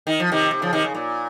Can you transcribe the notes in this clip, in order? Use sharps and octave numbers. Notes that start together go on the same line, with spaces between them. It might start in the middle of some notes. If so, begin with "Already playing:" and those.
D#3
F3
C3 D#3
C3
C#3 F3
C3 D#3
C#3
A#2